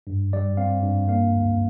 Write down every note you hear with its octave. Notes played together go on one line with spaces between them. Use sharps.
G2
G3 D5
C4 F5
G2
A#3 F5
D2